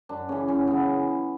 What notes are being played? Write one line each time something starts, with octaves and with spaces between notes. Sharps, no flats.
F#2 D4
C#3 E3 C#4
F#2 C#4
C#3 E3 B3